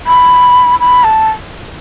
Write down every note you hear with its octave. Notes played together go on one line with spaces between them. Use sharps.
B5
B5
A5